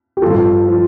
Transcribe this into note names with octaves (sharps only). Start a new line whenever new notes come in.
G4
G2 F3 F4 A4
F3